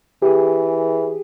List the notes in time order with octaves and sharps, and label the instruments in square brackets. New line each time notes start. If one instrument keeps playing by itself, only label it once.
[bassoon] E3 [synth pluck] G4 G#4